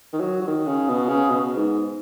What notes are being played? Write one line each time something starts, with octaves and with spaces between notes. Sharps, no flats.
D#3
F#3
F#3
D#3
C#3
B2
C#3
B2
G#2